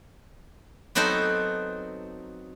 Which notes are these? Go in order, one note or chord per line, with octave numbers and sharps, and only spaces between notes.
F#3 B3 C4 D#4 A4 C5